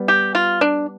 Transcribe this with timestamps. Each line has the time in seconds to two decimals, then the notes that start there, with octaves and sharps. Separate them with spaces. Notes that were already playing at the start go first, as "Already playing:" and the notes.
Already playing: G3 B3
0.08 G4
0.35 F4
0.61 D4